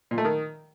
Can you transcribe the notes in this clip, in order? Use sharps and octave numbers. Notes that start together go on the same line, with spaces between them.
A#2
A3
D#3